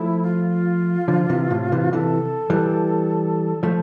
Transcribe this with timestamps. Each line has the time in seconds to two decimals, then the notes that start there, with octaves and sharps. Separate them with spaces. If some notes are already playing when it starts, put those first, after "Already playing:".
Already playing: F3 A3 E4
0.23 F4
1.08 D3 F3
1.29 C3 E3
1.50 A2 C3
1.72 C3 E3
1.93 C3 E3 A4
2.50 E3 G3
3.63 F3 A3 C5